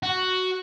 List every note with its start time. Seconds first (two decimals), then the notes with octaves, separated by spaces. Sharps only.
0.03 F#4